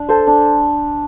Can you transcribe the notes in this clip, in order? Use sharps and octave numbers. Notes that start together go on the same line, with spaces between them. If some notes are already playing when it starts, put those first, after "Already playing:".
Already playing: D4
A4 C5
D4